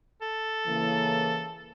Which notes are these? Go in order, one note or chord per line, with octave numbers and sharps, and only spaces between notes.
A4
C#3 E3 A#3